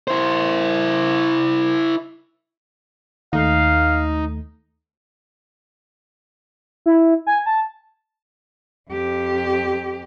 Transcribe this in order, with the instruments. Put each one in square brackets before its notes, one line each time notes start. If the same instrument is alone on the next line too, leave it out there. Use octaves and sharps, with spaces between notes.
[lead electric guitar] E4 C5
[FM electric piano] D#2 A3 [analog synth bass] D#4 [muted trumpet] F5
[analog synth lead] E4
G#5
A5
[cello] F2 G4